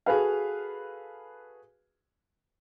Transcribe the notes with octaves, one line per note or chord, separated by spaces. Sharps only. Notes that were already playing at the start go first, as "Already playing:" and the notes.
F#4 G#4 A4 B4 F5